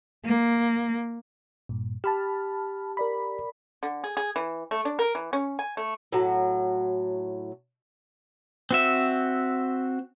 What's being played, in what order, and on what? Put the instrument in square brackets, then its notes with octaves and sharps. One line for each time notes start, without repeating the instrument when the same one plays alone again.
[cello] A#3
[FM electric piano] G2 A#2
[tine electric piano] G4 [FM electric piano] A5 B5 F6
[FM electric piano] A#4 D5 B5
[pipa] D3
G#4
G#4
E3
A3
D4
A#4
E3
C#4
G#5
A3
[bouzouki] A2 F#3
[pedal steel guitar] C4 F#4 E5